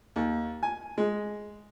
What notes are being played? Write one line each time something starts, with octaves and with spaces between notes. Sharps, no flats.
D#2
G#5
G#3